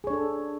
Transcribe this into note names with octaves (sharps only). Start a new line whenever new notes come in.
D4 G#4 A4 C#5